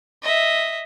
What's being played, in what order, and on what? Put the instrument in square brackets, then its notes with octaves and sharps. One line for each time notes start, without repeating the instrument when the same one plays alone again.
[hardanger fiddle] D#5 E5